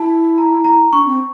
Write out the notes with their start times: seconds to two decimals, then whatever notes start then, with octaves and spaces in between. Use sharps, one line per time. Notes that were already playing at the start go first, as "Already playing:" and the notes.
Already playing: E4 A5
0.38 A#5
0.64 A#5
0.91 D4 C#6
1.05 C4